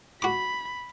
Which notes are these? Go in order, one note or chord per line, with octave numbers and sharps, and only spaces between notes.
F#4 B5 D6